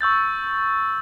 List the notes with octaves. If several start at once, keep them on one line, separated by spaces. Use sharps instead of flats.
C#6 E6 G6 A6